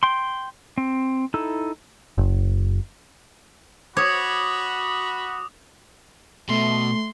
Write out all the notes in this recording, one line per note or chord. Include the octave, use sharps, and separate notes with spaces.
G5 C6
C4
D#4 E4 A4
F#1
F#4 C#5 B5 D6 D#6
B2 A3 C6